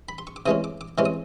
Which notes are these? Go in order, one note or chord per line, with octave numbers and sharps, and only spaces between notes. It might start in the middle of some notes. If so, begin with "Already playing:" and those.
B5
C6
C#6
D6
C3 E3 G#3 C#4 D#6
D6
D6
C3 E3 G#3 C#4 D6
D#6